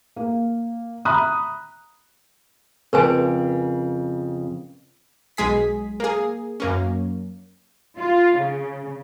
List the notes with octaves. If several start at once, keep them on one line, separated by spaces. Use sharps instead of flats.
A#3
E5 A#5 B5 D#6 F#6
F2 C#3 A#4 B4 G#5
B1 G#3 G#4 B6
A#3 G#4
F#2 A#3 C#4
F4
C#3